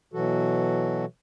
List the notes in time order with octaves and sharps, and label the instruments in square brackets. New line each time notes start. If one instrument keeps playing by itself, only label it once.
[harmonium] B2 E3 F#3 F#4 A4